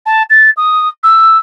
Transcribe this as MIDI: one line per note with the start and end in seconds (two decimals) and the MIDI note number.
0.06 0.23 81
0.30 0.50 93
0.57 0.88 87
1.03 1.37 88